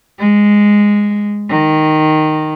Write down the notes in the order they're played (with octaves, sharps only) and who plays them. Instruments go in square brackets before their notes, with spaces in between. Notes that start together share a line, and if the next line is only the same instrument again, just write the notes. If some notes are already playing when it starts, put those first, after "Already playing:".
[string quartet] G#3
D#3